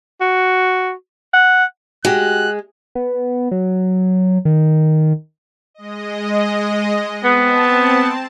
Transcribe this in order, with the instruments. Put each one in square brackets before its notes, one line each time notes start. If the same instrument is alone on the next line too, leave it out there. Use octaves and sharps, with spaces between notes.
[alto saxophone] F#4
F#5
[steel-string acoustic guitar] G#3 [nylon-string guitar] F#4 G4 [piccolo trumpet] F#6
[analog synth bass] B3
F#3
D#3
[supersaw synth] G#3 D#5
[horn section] B3 [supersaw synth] C4 A5